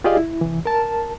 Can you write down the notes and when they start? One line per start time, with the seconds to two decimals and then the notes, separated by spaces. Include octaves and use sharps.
0.04 F4 G4 G#4 D5 D#5 F5
0.17 E4
0.41 C2 E3
0.66 A#4 A5